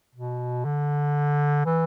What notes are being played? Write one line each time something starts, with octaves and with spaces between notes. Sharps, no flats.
B2
D3
E3